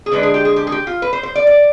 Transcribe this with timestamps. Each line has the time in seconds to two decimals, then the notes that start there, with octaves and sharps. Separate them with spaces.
0.06 G#4
0.11 D3 G#3 D4 B4
0.23 G#4
0.34 G4
0.45 G#4
0.56 G4
0.67 G#4
0.72 G4
0.87 F4
1.02 B4
1.13 C5
1.23 C5
1.35 D5
1.47 D5